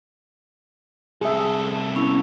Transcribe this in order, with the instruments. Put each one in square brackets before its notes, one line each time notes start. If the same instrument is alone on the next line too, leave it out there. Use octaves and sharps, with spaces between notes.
[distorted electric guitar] C2 A4 [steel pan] G#4 E5
[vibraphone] B3 C#4 E4